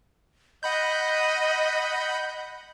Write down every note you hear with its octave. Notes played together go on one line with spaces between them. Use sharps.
D#5 F#5 B5 G6